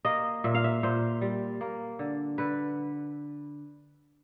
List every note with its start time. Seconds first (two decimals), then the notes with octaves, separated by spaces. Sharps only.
0.05 A#3 D#5
0.44 A#2 E5
0.55 F5
0.64 E5
0.83 A#2 C5
1.21 G3
1.61 A#3
1.99 D3
2.38 D3 B4